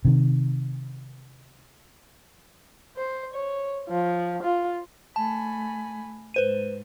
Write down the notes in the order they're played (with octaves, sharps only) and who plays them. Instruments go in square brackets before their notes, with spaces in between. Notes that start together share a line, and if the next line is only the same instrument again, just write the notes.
[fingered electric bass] C3 D#3
[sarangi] C5
C#5
F3
F4
[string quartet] A3 G#5 B5 [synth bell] A5
[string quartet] G#2 [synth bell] B4 C5 D#7